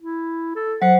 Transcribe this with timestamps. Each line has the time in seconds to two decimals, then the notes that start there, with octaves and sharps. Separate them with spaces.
0.02 E4
0.55 A4
0.82 F#3 C5 F#5